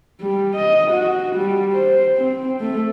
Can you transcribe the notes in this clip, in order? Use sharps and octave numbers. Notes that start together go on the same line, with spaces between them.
G3
D#5
F#4
G3
C5
C4
A3